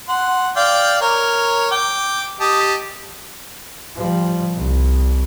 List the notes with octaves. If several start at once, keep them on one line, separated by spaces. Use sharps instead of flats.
F#5 C6
D5 F5 G5
A#4 C#5
G5 D6
G4 D#5 A5
F3 G3
C2